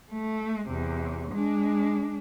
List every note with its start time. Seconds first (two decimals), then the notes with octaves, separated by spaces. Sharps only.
0.12 A3
0.68 E2 C3
1.31 G#3 D4